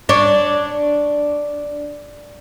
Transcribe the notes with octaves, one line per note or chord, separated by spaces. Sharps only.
D4 C#5